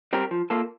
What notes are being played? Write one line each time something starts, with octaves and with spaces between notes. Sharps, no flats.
G3 C4 G4 A#4
F3
A#3 F4 A4